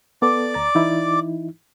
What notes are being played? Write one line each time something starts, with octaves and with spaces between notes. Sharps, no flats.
B3 A4 D5 D6
D2 A#5 A6
E3 D#4 E4